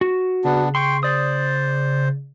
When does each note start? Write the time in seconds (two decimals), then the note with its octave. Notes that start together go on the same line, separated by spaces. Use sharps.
0.01 F#4
0.44 C#3 B3 D4
0.75 G5 C6 C#6
1.03 C5 D5 D#6